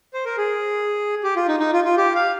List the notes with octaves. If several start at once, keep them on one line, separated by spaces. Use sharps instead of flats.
C5
A#4
G#4
G4
F4
D#4
D#4
F4
F4
G4
F5